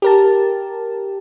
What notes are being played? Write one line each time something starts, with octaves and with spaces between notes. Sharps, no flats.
G4 A#4 A5